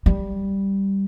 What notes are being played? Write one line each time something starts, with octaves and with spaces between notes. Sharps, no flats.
G3